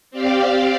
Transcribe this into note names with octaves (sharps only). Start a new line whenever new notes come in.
C4 G4 D5 F5